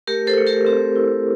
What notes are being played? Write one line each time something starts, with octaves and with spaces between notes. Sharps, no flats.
A3 G4 A#4
A4 C5
A3
G4 A#4
C4 G4
E4